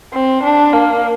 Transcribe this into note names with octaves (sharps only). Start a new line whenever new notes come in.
C4
D4
A#3